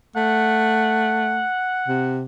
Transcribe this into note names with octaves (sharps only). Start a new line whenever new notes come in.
A3 F#5
C3